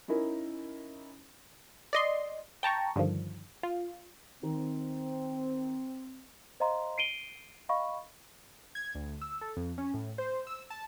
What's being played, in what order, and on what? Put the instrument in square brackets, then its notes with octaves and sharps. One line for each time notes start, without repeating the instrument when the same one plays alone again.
[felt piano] C#4 D#4 E4 A#4
[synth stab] D5 D#5 C6
G5 A5 A#5 C#6
G2 D3 D#3 F3
F4
[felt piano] D#3 [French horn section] C4
[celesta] C5 D#5 F5 A#5 C6
C7 D7 D#7 G7
D#5 F5 B5 C#6
[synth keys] G#6
D2
E6
A4
F2
C#4
A2
C5
E6
A5